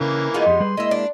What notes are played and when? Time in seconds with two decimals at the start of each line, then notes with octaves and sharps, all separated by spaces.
0.01 C#3 E3 A#3
0.34 G#3 B3 D#4 F4
0.46 F2 G4 C6
0.60 G3 G#4 B4
0.77 G#3 A#3 E4 D#5 E5
0.91 D4